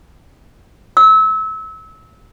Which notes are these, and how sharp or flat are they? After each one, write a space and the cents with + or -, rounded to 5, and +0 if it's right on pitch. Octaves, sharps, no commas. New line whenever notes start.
E6 -30